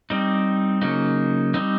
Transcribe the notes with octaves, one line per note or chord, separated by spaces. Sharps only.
G3 C4 D#4
C#3 F#3 A#3 D#4
G3 C4 D#4